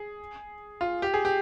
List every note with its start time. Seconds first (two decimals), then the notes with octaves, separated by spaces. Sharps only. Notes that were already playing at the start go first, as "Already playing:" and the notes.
Already playing: G#4
0.81 F4
1.02 G4
1.14 G#4
1.25 G4